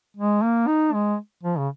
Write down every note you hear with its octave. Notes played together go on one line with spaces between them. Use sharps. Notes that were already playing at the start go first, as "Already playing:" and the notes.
G#3
A#3
D#4
G#3
F3
C#3